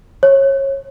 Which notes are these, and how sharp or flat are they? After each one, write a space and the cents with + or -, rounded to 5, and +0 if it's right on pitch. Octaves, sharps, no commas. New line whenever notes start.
C#5 -25